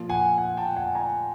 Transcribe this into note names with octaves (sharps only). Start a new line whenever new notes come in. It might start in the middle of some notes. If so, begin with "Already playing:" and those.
Already playing: A#2 F3
F#5 G#5
F#5 G#5
G5 A5
F#5 G#5
G#5 A#5